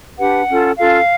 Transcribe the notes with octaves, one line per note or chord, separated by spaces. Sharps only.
D4 G4 B4 F#5
C#4 F4 A4
C#4 F4 A4 F5